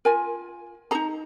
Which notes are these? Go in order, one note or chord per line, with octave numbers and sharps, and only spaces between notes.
F4 A#4 G#5
D#4 G#4 A#5